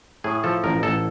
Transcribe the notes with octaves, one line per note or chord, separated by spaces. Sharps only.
A2 G#4
F3 A4
A1 A#4
A1 A4